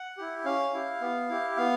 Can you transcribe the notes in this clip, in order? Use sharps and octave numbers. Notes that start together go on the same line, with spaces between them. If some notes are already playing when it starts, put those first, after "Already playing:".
Already playing: F#5
E4 G4
C#4 F5
E4 G4
B3
E4 G4
B3 F5